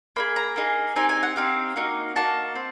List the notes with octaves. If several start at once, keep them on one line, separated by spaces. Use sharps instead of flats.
A#3 D#4 G#4 B5
A#5
A#3 D#4 G#4
C4 D#4 G4 G#5
G#5
F#5
C4 D#4 G4 F5
A#3 D#4 F#4
A#3 D#4 F#4 A5
C4